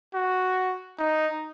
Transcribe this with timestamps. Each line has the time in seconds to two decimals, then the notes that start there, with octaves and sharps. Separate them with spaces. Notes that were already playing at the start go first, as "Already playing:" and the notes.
0.14 F#4
0.99 D#4